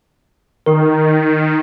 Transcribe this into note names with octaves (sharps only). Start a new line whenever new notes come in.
D#3 D#4 A#4